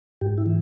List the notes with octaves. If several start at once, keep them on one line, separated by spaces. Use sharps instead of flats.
G#2 G4
E4
E3